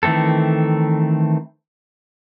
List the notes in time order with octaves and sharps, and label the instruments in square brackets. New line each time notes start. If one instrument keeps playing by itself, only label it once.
[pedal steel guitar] D#3 E3 A3 C4 A4